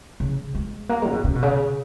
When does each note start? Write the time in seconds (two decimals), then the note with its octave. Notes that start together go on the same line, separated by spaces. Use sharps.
0.20 C#3
0.55 G#3
0.89 A#3
1.02 G#3
1.07 C#3
1.13 B2
1.24 C#3
1.35 B2
1.42 C#3